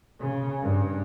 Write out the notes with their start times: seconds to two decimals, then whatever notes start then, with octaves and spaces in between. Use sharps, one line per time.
0.20 C#3
0.63 G2